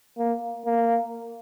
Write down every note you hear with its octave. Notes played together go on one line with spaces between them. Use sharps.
A#3
A#3